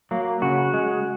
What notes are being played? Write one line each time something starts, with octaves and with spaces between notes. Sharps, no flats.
F#3 A#3
C#3 F#4
G#3